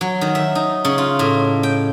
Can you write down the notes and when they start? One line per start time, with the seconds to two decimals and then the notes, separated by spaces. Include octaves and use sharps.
0.01 F#3
0.21 D#3
0.35 E5
0.55 D#4
0.85 C#3
0.98 F4
1.19 A2
1.63 G5